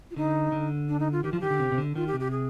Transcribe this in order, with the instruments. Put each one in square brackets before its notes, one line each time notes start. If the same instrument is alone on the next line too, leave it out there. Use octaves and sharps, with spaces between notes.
[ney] F4
[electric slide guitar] D3 [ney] D#4
[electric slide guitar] D3
[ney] D4
D#4
F4
[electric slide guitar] D#3 [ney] G4
[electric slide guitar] F3 [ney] F4
[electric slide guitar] D#3 [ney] G4
[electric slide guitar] D3
C3
C3
D3
[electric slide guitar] D#3 [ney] F4
[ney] G4
[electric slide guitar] C3
[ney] G4
G#4